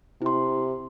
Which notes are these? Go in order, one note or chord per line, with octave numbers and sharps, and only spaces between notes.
C3 E4 C6